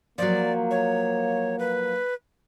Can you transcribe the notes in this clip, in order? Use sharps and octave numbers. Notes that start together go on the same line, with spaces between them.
F3 F#3 A#3 D5
C#5
B4